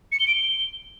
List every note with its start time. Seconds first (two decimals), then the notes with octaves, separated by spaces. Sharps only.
0.12 C#7
0.20 G7
0.27 D7
0.35 G7